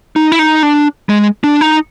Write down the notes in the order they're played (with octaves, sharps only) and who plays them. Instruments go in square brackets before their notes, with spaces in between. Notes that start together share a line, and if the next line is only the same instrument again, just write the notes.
[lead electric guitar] D#4
E4
D#4
D4
G#3
D4
D#4